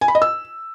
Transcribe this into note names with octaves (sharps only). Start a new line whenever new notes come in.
G#5
B5
D#5
E6